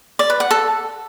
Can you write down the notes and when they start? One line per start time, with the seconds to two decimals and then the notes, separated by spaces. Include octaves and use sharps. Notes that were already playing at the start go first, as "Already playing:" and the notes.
0.19 D5
0.30 B4
0.40 F#5
0.51 A4